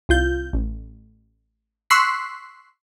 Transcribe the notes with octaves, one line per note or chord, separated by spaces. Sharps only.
C2 F4 G6
A1
C6 C#6 E6 F#6 B6 C7